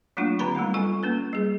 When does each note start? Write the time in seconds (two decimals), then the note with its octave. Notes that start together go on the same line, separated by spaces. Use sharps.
0.17 F#3 A3 A#3 D4 F4
0.39 D3 C4 G4 B4 A#5 B5
0.55 G3 A3 B3 D#4
0.74 G3 F4 A4 G#5
1.03 A#3 C#4 B4
1.33 G3 G#4